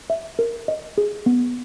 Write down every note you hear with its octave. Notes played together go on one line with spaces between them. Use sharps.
E5
A#4
D#5
G#4
B3